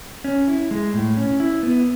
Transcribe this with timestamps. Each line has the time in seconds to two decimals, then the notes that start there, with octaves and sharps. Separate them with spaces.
0.24 C#4
0.48 E4
0.71 G#3
0.94 A2
1.17 C#4
1.40 E4
1.63 B3